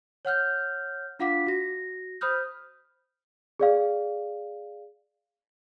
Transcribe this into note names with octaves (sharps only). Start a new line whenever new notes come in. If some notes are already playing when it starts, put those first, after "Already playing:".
C#5 F#5 F6 G6
D4 F4 F5 F#5 D6 B6
F#4 A#6
C5 B5 D#6 F6 G6
G#4 D5 F5